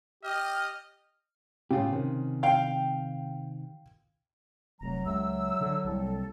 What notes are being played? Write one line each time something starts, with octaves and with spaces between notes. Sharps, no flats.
G4 D#5 F6
A2 C#3 F4 G4
C3 D#3
F5 G5
F1 F#3 A#5
C#2 E5 E6
D3
C2 A#3 C4 A4